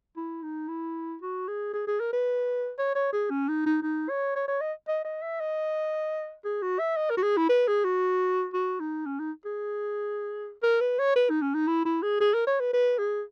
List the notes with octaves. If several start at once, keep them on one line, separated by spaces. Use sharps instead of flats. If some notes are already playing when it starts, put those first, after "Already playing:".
E4
D#4
E4
F#4
G#4
G#4
G#4
A#4
B4
C#5
C#5
G#4
C#4
D#4
D#4
D#4
C#5
C#5
C#5
D#5
D#5
D#5
E5
D#5
G#4
F#4
E5
D#5
A#4
F#4
G#4
E4
B4
G#4
F#4
F#4
D#4
C#4
D#4
G#4
A#4
B4
C#5
B4
D#4
C#4
D#4
E4
E4
G#4
G#4
A#4
C#5
B4
B4
G#4